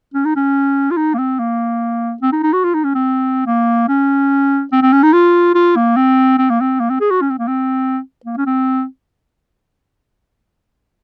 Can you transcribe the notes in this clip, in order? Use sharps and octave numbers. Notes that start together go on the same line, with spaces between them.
C#4
D#4
C#4
F4
D#4
A#3
C4
A#3
C4
D#4
D#4
F#4
F4
D#4
C#4
C4
A#3
C#4
C4
C4
C#4
D#4
F4
F4
A#3
C4
C4
A#3
C4
A#3
C4
G#4
F#4
C#4
C4
A#3
C4
A#3
C#4
C4